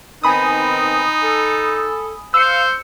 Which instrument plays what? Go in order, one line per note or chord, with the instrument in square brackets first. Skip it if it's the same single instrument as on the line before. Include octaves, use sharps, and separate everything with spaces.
[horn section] D#3 B3 C4 [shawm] D#4 [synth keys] G#5 B5 D#6
[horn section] A4
[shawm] C5 [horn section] F5 [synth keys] E6 C#7